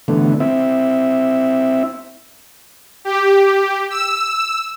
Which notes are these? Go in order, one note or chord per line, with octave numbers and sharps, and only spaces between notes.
D3 E3 A3 B3
C4 E4 E5
G4
E6